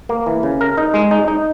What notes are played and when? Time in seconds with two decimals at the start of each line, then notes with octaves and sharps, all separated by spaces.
0.09 A#3
0.27 E3
0.43 C#3
0.61 A#4
0.78 D#4
0.94 G#3
1.11 D#4
1.28 D#4